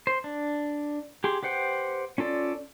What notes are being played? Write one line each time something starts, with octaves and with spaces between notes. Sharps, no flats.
C5
D4
G4 G#4 C6
G4 B4 C5 F#5 G5
C#4 F4 A4 D5